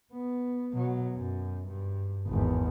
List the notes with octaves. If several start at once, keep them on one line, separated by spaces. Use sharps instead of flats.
B3
B2 F#3
F#2
G2
G#1 E2